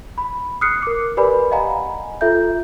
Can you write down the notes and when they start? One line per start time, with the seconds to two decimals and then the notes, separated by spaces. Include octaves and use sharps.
0.18 B5
0.61 D#6 F6 F#6 C7 C#7
0.83 A#4 D6
1.17 G4 A#4 B4 D5 G#5 B5
1.51 D#5 F5 F#5 G#5 A#5 B5
2.21 F4 A4 E5 G6